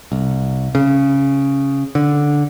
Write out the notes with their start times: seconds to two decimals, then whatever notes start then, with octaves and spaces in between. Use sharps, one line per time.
0.12 C2
0.75 C#3
1.95 D3